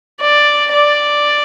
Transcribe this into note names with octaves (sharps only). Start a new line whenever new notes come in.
D5
D5